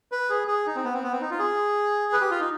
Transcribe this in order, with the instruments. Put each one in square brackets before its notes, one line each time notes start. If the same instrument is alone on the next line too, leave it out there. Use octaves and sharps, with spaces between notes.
[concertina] B4
G#4
G#4
D#4
C4
B3
C4
B3
C4
D#4
F4
G#4
B4
G4
F4
D#4